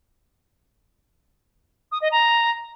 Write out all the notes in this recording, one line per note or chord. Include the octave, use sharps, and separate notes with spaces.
D#6
D#5
A#5